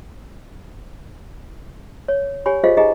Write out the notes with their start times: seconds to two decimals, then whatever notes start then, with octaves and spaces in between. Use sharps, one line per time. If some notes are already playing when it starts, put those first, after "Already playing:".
2.08 C#5
2.46 G4 C#5 G#5 B5
2.64 F4 G4 G#4 C5 D#5 F5
2.77 D#4 G4 G#4 D#5 A#5